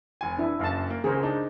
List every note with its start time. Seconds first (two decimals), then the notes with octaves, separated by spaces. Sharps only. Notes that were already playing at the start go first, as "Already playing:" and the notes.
0.21 F1 G#5
0.38 E3 D4 E4
0.59 F#1 F#2 F5 A5
0.90 A#3
1.04 C#2 C#3 G#4 A#4 C5
1.23 D4 D#4